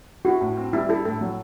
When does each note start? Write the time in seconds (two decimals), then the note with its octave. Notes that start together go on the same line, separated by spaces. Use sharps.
0.25 E4 F#4
0.41 A2
0.57 C4
0.73 G3 E4
0.89 E4 A4
1.05 A2 A4
1.21 F#3